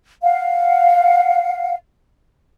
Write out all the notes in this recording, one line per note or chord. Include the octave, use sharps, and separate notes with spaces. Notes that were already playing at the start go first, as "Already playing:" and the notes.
F5 F#5